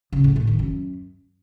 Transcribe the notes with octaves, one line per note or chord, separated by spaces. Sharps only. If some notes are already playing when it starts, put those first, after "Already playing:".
C#3
A2
A2
D#3
F#2